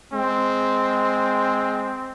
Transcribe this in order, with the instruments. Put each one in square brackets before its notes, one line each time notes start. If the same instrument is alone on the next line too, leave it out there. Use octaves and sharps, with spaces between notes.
[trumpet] G#3 [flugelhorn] C4